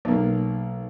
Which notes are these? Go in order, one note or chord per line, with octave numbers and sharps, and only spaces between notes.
B1 A#3